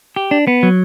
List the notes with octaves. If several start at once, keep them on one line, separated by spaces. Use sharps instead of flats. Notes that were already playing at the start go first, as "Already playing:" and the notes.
G4
D4
B3
F#3